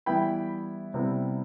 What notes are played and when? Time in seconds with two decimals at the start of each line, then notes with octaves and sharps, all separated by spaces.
0.06 E3 G3 B3 E4 G5 B5
0.94 C3 G3 B3 E4